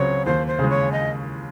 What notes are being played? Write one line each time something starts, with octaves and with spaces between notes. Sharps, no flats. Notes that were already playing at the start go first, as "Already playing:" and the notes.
Already playing: C#2 C#3 F#3 C4 F#4 C#5
D#2 C5
C5
C#3 G#3
C#5
D#5